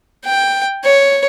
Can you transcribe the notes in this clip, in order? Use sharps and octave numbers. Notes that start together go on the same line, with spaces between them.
G5
C#5